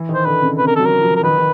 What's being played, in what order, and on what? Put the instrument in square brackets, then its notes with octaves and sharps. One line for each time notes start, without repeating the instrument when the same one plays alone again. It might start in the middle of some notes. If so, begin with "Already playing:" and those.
Already playing: [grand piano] E3
D#3
[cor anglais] C5
[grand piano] D3 [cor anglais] B4
[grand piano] C#3
[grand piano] C3 [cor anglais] B4
[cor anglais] A#4
A4
[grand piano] F#3
[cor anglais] A#4
[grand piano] F3
[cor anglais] A#4
[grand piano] D#3 [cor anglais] B4
[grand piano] D#3